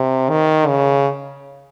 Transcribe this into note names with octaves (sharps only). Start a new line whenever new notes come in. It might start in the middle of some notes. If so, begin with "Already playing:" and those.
Already playing: C3
D#3
C#3